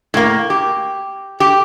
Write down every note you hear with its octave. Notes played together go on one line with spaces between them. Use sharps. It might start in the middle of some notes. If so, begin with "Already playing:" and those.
A2 A#3
G4
G4